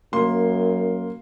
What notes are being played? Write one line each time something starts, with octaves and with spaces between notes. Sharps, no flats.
F#2 A#3 C6